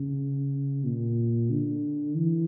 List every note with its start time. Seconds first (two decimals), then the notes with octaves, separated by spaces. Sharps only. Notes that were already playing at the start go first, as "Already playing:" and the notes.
Already playing: C#3
0.85 A#2
1.50 D3
2.15 E3